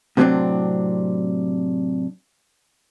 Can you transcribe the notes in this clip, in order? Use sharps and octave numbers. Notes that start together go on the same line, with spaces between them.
A2 C3 F#3 A3 C4 D4